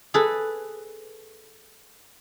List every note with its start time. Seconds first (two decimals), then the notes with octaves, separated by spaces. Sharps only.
0.14 G#4 A4 B4